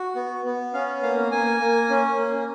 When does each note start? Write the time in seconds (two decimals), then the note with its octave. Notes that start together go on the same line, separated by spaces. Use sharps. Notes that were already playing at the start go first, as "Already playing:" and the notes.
Already playing: F#4
0.16 B3
0.45 B3
0.73 C#4 F5
1.03 A#3 F5
1.31 A#3 G#5
1.60 A#3
1.90 C#4
2.18 A#3